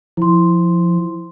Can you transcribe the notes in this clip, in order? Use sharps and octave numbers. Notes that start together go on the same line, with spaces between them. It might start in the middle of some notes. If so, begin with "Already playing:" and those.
F3 E4 C6